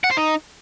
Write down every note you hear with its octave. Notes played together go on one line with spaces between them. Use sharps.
F#5
C5
D#4